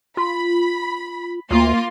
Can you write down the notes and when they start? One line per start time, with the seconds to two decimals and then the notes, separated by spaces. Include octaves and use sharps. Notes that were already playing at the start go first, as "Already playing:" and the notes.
0.17 F4 B5
1.51 D2 A#3 F4 C6